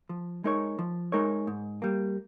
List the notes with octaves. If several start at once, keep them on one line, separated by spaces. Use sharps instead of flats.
F3
G#3 D#4 A#4 C#5
F3
G#3 D#4 A#4 C#5
G#2
G3 A#3